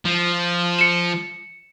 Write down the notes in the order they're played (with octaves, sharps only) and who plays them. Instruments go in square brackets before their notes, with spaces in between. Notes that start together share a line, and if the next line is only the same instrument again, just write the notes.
[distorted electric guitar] F3
[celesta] C#7 E7